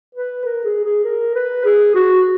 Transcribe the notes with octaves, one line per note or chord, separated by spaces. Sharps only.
B4
A#4
G#4
G#4
A#4
B4
G#4
F#4